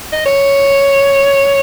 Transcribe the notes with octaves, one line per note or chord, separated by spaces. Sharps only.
D#5
C#5